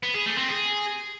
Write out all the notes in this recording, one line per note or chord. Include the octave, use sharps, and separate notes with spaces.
B3
G#4
A3
C4
G#4